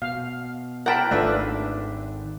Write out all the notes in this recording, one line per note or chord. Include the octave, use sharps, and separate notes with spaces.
B2 F5
A#4 F#5 G5 A5 B5
G#1 D#3 A3 D4 F4 B4 E5